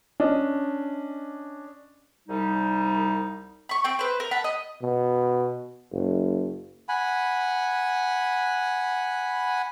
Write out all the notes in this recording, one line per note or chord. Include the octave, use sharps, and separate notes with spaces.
C#4 D4 D#5
C2 G3 D#4
B5 C#6
C4 G5
B4 C5
A#4
F#5 A5 B5
D#5
B2
F#1
F#5 G#5 B5